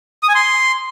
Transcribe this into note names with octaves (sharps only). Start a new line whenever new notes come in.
D#6
G#5
C6